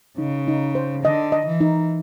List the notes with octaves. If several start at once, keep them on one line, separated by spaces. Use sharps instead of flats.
C#3 D#4
D#4
C5
D3 D#5
D#5
E3
D#4